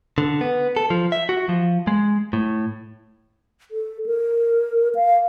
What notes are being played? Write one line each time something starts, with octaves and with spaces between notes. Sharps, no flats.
D3
B3
A4
F3
E5
F#4
F3
G#3
A2
A4
A#4
F5